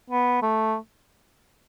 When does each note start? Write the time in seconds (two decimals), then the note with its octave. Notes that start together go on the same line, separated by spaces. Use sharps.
0.10 B3
0.43 A3